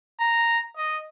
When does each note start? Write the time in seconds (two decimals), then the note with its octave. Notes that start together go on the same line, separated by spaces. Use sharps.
0.20 A#5
0.76 D#5